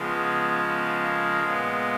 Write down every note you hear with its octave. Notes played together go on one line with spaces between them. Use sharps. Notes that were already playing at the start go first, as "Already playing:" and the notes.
Already playing: C#3 F3 G#3 B3
B3
A#3
A#2 G#3 B3